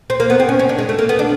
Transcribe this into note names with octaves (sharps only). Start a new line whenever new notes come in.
C4
A#3
B3
C4
C#4
C#4
D4
G#3
A3
A#3
B3
D4